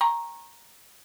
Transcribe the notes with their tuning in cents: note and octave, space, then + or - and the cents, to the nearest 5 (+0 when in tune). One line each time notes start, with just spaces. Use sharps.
G5 +15 A#5 +0 C#6 -25